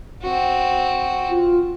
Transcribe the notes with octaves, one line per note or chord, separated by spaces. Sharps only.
C4 F#4
F4